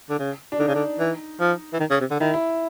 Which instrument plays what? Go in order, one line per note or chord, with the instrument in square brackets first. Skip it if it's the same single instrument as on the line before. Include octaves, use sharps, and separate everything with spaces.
[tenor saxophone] D3
C#3
[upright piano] D4
[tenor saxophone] D3 [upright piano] D#4
[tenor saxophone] C#3
D3
E3
F3
E3
D#3
C#3
C3
D3
[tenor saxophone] D#3 [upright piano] E4
[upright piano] E4